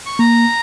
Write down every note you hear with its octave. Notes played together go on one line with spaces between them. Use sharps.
C#6
A#3 A#5